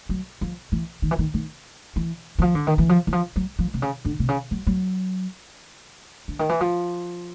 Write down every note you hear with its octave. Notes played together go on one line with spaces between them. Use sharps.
F#3
F3
E3
D#3
E3
D#3
D#3
E3
E3
F3
D3
D#3
E3
F3
E3
F3
F#3
F3
C3
C#3
D3
C3
C#3
F#3
F#3
D3
D#3
E3
F3